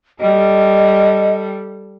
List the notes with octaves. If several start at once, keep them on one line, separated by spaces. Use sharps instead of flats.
G3 A4 D#5